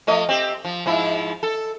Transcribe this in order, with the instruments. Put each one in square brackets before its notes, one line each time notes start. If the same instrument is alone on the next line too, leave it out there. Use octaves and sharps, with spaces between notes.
[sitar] F3 A3 D#5
C4 G4
F3
G#2 F3 E4
A4